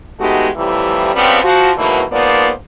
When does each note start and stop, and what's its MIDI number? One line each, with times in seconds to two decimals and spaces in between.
0.20 0.48 56
0.20 0.48 57
0.20 0.48 59
0.20 0.48 63
0.20 0.48 66
0.20 0.48 67
0.56 1.12 45
0.56 1.12 48
0.56 1.12 52
0.56 1.12 53
0.56 1.12 55
1.15 1.40 49
1.15 1.40 53
1.15 1.40 55
1.15 1.40 59
1.15 1.40 60
1.44 1.71 53
1.44 1.71 66
1.77 2.03 44
1.77 2.03 47
1.77 2.03 52
1.77 2.03 54
1.77 2.03 57
1.77 2.03 58
2.12 2.50 44
2.12 2.50 53
2.12 2.50 58
2.12 2.50 59
2.12 2.50 72
2.12 2.50 74